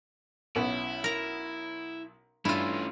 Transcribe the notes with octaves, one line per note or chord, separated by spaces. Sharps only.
B1 B3 C#4 E4
A#4 A#5
G2 A3 C#4 E4 F4